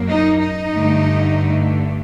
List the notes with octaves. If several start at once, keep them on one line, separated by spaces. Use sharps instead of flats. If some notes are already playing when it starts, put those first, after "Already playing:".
Already playing: F#2 F#3 A#3
D#4
D#4
G2 D3 A3